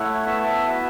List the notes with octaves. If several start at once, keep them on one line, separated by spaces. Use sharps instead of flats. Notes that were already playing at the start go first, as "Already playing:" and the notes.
Already playing: A3 E4 C#5 F#5
B3 E5 A5
F#4 B4 E5